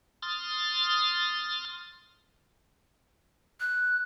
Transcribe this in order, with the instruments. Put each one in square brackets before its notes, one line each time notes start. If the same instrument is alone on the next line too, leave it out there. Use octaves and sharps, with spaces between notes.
[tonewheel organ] C6 D#6 F6 A6
[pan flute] F#6